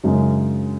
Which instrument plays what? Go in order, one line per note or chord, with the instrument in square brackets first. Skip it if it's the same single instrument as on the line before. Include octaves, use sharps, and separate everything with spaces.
[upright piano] F#2 C#3 G#3 C#4